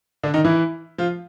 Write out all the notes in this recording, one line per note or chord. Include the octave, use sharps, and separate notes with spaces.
D3 D4
D#3 D#4
E3 E4
F3 F4